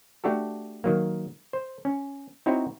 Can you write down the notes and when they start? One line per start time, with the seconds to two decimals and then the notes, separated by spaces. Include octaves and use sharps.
0.24 A3 D4 F#4 G4 A4
0.84 D#3 F#3 A#3
1.53 C5
1.85 C#4
2.46 C4 D#4 E4 F#4 C#5